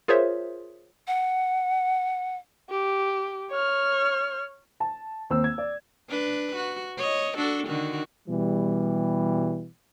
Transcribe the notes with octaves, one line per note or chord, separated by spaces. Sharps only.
F4 G#4 A#4 C5 C#5 E5
F#5
G4
C#5 F6
A5
D#2 C4 E6
G#6
D5
D4 B4
F#4
C#5 D#5
D4 F#4 A4
D3 D#3 F#4
B2 E3 G3